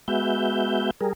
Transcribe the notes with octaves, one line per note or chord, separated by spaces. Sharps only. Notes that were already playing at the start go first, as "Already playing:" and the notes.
G#3 B3 F#4 E5 G6
G3 G#4 A#4